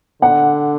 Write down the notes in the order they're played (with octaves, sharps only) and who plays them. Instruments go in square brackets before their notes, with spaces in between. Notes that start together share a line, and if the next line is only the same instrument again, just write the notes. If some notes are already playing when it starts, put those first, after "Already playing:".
[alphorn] D3 [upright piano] F#5